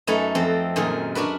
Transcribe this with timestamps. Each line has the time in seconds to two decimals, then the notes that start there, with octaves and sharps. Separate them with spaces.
0.07 F#2 A3 D#4 B4 C#5 G#5
0.35 F2 C4 A4
0.76 F#2 A#2 D#3 G#4
1.15 D4 F#4 A#4 B4